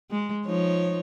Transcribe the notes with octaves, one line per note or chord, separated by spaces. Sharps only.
G#3
F3 D#4 C#5